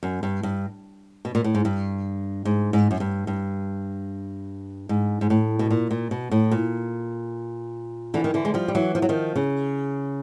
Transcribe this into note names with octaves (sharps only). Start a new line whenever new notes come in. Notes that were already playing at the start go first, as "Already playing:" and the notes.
F#2
G2
G2
B2
A#2
A2
G#2
G2
G#2
G#2
F#2
G2
G2
G#2
G#2
A2
B2
A#2
A#2
B2
A2
A#2
D3 E3
D#3
D3 E3
G#3
F3 G3
G3
E3 F#3
F3
F#3
D#3 F3
C#3